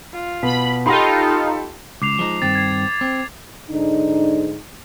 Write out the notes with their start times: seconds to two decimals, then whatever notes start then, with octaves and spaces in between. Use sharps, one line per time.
0.13 F4
0.43 B2 B5
0.86 D#4 F4 G4 A4 B5 C6
2.02 C#2 D6 C7 F7
2.19 F3 G#3 D#4
2.42 G2 D#3 C4 A6
2.55 G#6 C7
3.01 C4
3.70 G#2 D3 D4 D#4